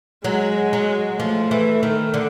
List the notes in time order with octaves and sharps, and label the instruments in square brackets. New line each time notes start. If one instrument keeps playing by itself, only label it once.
[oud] F#3 [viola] G#3
[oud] F#3
[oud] F3 [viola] A3
[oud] E3
D#3
D3